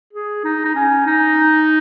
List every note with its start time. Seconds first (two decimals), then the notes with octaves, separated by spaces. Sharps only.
0.13 G#4
0.44 D#4
0.65 D#4
0.75 C#4
1.06 D#4